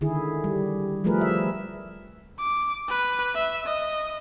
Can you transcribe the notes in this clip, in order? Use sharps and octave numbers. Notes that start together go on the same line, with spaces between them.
D3 D#3 E4 G#4
G3
F3 G3 A3 G#4 A#4 B4
E5
D6
B4
E5
D#5